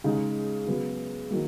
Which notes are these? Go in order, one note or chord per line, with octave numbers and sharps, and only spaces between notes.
C#3 G#3 D#4
C#3 F#3 B3
D#3 F#3 A#3